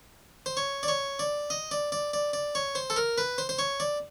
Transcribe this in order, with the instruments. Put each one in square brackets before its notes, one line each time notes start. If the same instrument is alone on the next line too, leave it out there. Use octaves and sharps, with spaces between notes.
[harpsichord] C5
C#5
D5
C#5
D5
D#5
D5
D5
D5
D5
C#5
C5
A4
A#4
B4
C5
C5
C#5
D5